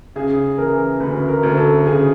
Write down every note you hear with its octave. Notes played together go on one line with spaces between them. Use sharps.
C#3 G#4
E3 A#4
D2 B4
A#4
D2
A4
C#3 G#4